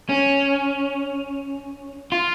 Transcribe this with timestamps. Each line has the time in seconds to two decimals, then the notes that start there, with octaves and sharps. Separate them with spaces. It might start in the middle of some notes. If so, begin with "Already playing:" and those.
0.09 C#4
2.12 F4